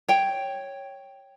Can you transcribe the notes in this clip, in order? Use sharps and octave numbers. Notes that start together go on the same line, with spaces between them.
C#5 G5